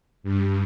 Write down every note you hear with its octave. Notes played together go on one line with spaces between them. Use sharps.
G2